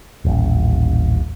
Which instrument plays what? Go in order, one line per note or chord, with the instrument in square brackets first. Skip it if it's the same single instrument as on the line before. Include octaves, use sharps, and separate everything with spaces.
[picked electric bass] D#1 A1